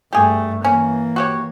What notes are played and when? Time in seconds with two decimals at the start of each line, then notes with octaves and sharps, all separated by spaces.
0.13 G2 A3 G4 G#4
0.64 E3 A#3 C#4
1.16 F#4 G4 C#5